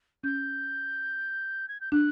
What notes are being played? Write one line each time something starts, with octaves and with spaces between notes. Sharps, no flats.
C#4 G6
G#6
G6
D4 F#6